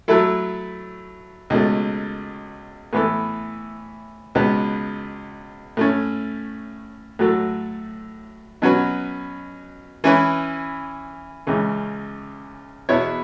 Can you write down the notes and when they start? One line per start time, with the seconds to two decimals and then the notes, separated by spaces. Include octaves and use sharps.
0.08 F#3 A3 E4 A4
1.50 C#2 B2 A3
2.93 A2 E3 B3 E4 A4
4.35 C#2 B2 B3
5.77 A2 A3 C#4
7.19 A2 F#3 A3 F#4 A4
8.62 B2 F#3 C#4 F#4 B4
10.04 E3 C#4 E4 B4
11.47 C#2 C#3 E3
12.89 E2 B2 B3 E4 C#5